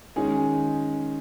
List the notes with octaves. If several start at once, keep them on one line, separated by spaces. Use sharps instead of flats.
D#3 G#3 C#4 G#4